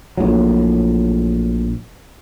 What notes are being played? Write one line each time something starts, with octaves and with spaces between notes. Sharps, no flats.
A#1 A2 F#3